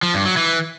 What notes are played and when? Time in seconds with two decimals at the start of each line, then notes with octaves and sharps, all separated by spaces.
0.03 F3
0.14 G2
0.25 F#3
0.37 E3